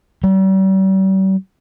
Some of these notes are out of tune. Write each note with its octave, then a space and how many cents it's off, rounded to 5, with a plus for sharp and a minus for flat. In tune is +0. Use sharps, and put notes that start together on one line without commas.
G3 -40